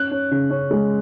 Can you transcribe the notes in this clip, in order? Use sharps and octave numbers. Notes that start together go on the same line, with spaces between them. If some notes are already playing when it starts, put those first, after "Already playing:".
Already playing: C#4 F#6
C#4
C#3
C#4
G#3